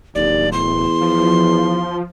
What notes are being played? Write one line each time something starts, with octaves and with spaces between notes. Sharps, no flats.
D1 D#2 D5
E2 C6
F3